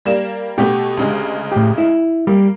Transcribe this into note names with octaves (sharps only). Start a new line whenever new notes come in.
G3 A#3 E7
B2 A3 B3 G4
D2 C#3 G#3
A2 G4
E4
G3 A#3